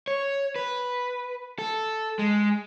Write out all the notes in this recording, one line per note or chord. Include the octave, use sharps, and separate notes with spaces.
C#5
B4
A4
G#3